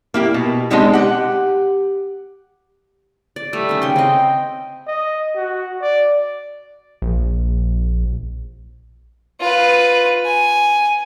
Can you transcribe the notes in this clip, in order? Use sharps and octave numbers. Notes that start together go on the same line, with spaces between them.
A#3 E4 G4
B2
G#3 B3 C4 D4 D#4 G4
G4 F#5
D5
G3 A3
D#3 C#4
C#3 G5 C6
C4 D#5
D#5
F#4
D5
A#1
F4 B4
G#5